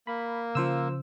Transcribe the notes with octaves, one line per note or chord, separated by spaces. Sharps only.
A#3 B5
C#3 F3 C#4 C5 E6